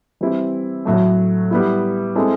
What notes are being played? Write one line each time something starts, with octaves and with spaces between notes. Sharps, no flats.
E3 G3 C4 E4
A2 F#3 A3
G3 B3 E4
G#3 C4 E4 A4